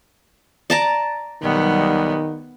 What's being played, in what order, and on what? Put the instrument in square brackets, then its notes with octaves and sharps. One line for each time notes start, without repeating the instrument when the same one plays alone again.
[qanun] D5 A5 A#5
[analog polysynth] B1 G3 F#5 [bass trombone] D#3 [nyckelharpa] B3